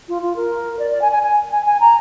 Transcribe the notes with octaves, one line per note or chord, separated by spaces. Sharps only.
F4
F4
A#4
D5
D5
G#5
G#5
G#5
G#5
G#5
A#5